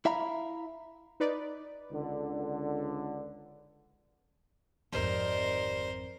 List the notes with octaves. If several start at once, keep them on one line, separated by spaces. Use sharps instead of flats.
E4 E5 F5 A#5 B5
D#4 B4 D5
C#2 D3
G#1 F2 D3 D#3 G3 A#4 C5